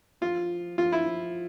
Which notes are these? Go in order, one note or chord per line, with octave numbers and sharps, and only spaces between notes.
F3 F4
F3 F4
E4
F3